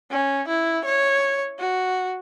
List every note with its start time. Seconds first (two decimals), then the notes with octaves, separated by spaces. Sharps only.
0.10 C#4
0.48 E4
0.85 C#5
1.58 F#4